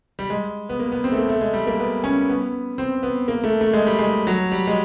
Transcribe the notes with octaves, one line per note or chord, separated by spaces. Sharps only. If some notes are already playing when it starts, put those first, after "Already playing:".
G3
G#3
B3
A#3
B3
C4
A3
A#3
A3
G#3
G3
A#3
B3
C#4
B3
C4
B3
A#3
A3
A3
G#3
G3
G#3
F#3
G3
G#3